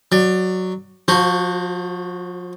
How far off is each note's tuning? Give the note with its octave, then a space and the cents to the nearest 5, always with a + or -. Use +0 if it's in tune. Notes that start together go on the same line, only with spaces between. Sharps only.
F#3 +0 D5 +20
F3 +35 F#4 +0 C5 +0